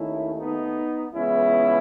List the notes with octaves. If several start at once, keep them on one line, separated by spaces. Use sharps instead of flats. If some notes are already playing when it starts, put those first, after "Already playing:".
Already playing: D#2 D#3 A3 C#4 E4
B3 D#4
C#2 C#3 E3 G#3 B3 C#4 E4